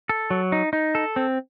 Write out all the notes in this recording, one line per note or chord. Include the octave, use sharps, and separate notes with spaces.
A4
F#3
D#4
D#4
A4
C4